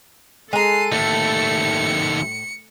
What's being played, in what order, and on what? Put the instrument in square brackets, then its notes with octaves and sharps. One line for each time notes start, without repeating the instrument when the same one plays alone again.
[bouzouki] G#3 A#5 [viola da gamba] A4 [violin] C7 D#7
[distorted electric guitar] D#2 A3 [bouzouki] A2 [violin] C#7